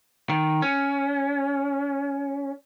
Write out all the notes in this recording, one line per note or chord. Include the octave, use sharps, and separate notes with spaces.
D#3
C#4